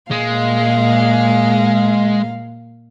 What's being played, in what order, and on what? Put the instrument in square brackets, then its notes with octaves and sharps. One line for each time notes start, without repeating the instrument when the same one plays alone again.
[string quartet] A#2 F5 [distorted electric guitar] G#3